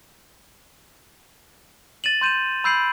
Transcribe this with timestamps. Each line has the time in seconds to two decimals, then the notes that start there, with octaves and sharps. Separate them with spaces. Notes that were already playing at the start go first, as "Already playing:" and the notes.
2.04 A6 D#7 E7 F#7
2.21 C6 G6 D#7 E7 F#7
2.64 B5 E6 G6 C7 D7 F#7